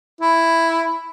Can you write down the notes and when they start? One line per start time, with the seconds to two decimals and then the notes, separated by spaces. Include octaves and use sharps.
0.21 E4